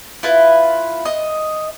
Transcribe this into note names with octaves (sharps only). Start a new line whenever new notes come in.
E4 F4 B4
D#5